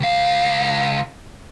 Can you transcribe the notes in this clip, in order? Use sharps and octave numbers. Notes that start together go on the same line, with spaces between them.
C#2 F5